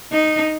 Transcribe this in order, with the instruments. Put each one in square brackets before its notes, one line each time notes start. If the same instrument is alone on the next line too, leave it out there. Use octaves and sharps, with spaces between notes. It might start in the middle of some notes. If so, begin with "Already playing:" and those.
[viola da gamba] D#4